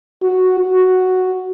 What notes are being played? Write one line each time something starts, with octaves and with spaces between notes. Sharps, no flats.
F#4
F#4